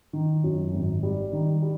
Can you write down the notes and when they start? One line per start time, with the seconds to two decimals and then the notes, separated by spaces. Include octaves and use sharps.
0.13 D#3
0.44 F#2
0.74 G#1
1.03 G3
1.33 D#3
1.62 G3